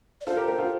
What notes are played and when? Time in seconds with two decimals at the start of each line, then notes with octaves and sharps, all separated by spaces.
0.21 D5
0.26 F4 A4 C5
0.37 G4 A#4
0.47 G4 A#4
0.58 F4 A4